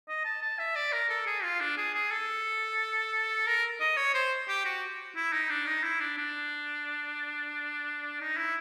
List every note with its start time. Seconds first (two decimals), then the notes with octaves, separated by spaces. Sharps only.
0.08 D#5
0.25 A5
0.42 A5
0.59 E5
0.75 D5
0.92 A#4
1.09 A4
1.26 G#4
1.43 F4
1.60 D4
1.77 G#4
1.94 G#4
2.11 A4
3.46 A#4
3.80 D#5
3.97 C#5
4.14 C5
4.48 G4
4.65 F#4
5.16 E4
5.33 D#4
5.49 D4
5.66 D#4
5.83 E4
6.01 D4
6.17 D4
8.20 D#4
8.37 E4